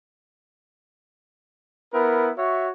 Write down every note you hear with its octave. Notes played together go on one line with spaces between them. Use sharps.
B3 E4 A#4
F#4 C#5 E5